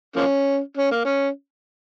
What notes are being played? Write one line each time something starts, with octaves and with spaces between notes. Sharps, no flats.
F3 A#3 C#4
C#4
A#3
C#4